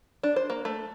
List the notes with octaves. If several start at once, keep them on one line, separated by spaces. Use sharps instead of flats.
D4
C5
A#3
A3